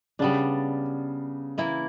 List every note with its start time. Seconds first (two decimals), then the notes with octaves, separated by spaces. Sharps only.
0.19 C#3 G3 B3 D4
1.58 E3 A#3 E4